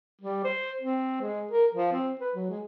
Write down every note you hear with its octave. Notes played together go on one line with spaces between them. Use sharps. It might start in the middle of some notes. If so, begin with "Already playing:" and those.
G3
C5
C4
G#3
A#4
F3
C4
B4
F#3
G#3